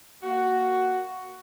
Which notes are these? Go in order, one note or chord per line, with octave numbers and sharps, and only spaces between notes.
A#3 F#4